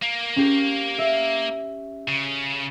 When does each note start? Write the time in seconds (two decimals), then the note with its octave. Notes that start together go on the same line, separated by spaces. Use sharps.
0.02 A#3
0.36 C#4 G4
0.98 E5
2.08 C#3